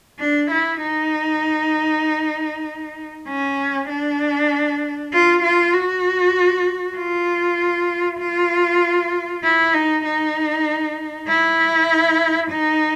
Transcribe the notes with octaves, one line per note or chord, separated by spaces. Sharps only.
D4
E4
D#4
C#4
D4
F4
F4
F#4
F4
F4
E4
D#4
D#4
E4
D#4